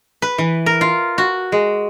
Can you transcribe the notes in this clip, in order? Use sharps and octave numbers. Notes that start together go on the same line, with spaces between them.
B4
E3
A#4
F4
F#4
G#3